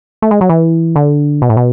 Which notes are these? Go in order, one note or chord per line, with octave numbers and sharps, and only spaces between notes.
A3
G#3
F#3
E3
D3
B2
A2
B2